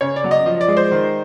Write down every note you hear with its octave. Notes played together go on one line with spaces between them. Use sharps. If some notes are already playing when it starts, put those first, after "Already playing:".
C#3 C#5
D5
F#3
D#5
F3 D#5
D5
G#3
C5
D#3